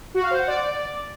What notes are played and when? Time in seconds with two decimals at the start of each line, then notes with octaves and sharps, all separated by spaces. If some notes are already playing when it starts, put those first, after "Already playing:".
0.14 F#4
0.23 F5
0.31 C5
0.39 F#5
0.47 D5